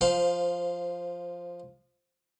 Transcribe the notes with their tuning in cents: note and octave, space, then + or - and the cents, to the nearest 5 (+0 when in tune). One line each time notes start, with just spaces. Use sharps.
F3 +0 C5 -15 F5 +20